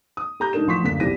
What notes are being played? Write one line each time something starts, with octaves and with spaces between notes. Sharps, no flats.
D#6
G4 A#5 G6
G#2 D4 D#4 A#4 E7
A1 F3 C6 C#6 B6
F#1 D2 C#3 A#3 B6
B1 E2 C4 G4 A#6 D#7